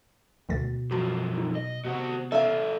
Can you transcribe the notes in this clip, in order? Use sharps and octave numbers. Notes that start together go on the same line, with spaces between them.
D2 B2 D3 A6
F#2 F3 F#4 A5
D#4
D#5
C3 B3 F#4 C5 F#5
C#4 A4 E5 F5